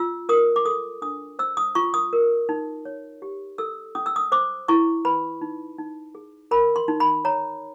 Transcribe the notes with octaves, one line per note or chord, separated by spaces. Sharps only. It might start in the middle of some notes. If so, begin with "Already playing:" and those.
Already playing: F4 E6
A#4 D#6
D6
A4 D#6
D4 D#6
C5 E6
D#6
F4 C#6
D#6
A#4
D#4
C#5
G4
A4 E6
C#4 D#6
E6
D#6
C5 D6
E4 C#6
B4 B5
D#4
D#4
G#4
A#4 B5
C6
D#4
B5
C#5 A#5